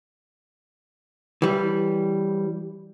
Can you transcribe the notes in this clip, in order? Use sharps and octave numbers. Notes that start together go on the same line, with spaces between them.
E3 G3